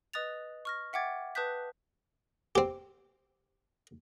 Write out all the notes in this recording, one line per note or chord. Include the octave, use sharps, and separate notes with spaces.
B4 D#5 D#6 F#6 A6 F7
C#6 F6 A#6
E5 F#5 G5 D6 G#6 A6
B4 A5 D#6 F#6 G6 B6
C4 G4